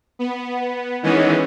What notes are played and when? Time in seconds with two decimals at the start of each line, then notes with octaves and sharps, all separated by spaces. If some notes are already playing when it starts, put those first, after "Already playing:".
0.19 B3
1.03 D#3 E3 G#3 B3 C#4